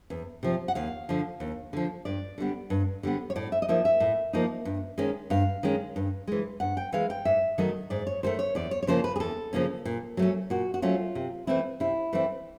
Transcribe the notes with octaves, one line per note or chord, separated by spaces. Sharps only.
E2
C3 F3
F#5
D#2 F5
D3 F3
D#2
D3 F3
G2 D5
D3 G3 B3
G2
D3 G3 B3
C#5
A2 D5
E5
D#5
F3 A#3 D#4 E5
E5
A2
F3 A#3 D#4
G2
D#3 G#3 C#4
G2 F5
D#3 G#3 C#4
G2
E3 G#3
G2 F#5
G5
E3 G#3 F5
G5
G#2 E5
D#3 F#3 A3 D#5
G#2 D5
C#5
D#3 F#3 A3 C5
C#5
E2 D5
C#5
C#5
C#3 F3 A#3 C#4 C5
B4
G#4
E2 A4
C#3 F3 A#3 C#4
A#2
F#3 A3 C#4
A#2 F#4
F#4
F#3 A3 C#4 F4
C3
E3 A3 C4 E4
C3 E4
E3 A3 C4 E4